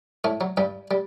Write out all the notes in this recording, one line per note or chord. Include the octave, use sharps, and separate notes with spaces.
A2 A3
F#3
G2 G3
G3